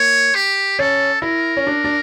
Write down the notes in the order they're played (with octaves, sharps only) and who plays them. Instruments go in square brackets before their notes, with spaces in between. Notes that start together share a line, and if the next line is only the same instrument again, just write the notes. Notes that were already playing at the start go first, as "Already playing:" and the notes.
Already playing: [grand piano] A#3 [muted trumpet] C#5
[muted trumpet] G4
[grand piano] C#4 [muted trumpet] A4
[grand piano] E4 [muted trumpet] A#4
[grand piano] C#4
D4
D4